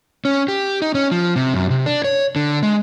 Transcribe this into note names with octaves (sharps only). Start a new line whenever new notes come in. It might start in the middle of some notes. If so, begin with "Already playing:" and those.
C#4
G4
D#4
C#4
F3
C3
F#2
C3
D4
C#5
D3
G#3